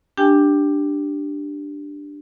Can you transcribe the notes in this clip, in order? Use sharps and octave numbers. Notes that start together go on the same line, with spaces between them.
D4 G4 G5 G#5